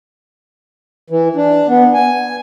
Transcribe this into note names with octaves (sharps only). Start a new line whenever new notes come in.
E3
D4
B3
G#5